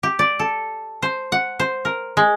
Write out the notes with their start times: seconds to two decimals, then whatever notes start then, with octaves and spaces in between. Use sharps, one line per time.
0.03 G4
0.19 D5
0.39 A4
1.02 C5
1.32 F#5
1.59 C5
1.85 A#4
2.17 G#3